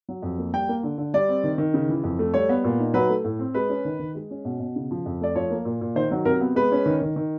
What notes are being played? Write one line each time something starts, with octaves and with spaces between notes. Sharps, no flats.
F#3
F2
A#3
G3 G5
A#3
D3
D3
G3 D5
C4
D#3
D#3
C#3
E3
F2
A3
G3 C#5
B3
A#2
D#4
F#3 B4
A3
A2
C4
G#3 B4
C#4
D#3
D#3
G#3
C#4
B2
B2
C#3
F3
F2
A3 D5
F3 C#5
A#3
A#2
A#2
D#3 C5
F#3
C3 A#4
B3
G#3 B4
C#4
D#3
D#3
D#3